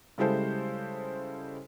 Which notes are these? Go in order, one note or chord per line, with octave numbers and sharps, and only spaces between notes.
C#3 G3 G#3 E4 A4 C5